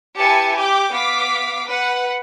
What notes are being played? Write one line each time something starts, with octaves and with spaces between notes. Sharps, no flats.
E4 G4 B4 G#5 A5 C#7
G4 D6 G6
B3 F5 D6 B6
B4 F#5